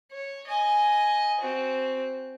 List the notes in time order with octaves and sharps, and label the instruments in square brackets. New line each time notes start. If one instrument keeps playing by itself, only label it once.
[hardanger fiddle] C#5
D#5 G#5
C4 F#4